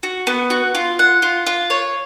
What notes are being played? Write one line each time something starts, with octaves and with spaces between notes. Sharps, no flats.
F#4
B3
F#4
F4
F#5
F4
F4
C#5